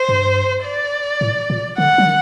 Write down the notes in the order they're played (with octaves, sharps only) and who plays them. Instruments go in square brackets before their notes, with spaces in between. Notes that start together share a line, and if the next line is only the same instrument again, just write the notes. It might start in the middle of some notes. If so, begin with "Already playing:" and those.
Already playing: [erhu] C5
[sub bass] G2
[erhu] D5
[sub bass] A2
A#2
[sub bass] D3 [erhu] F#5
[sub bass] F#3
D#3